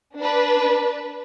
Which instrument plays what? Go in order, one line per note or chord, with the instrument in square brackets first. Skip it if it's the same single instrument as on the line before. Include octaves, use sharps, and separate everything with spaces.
[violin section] D4 B4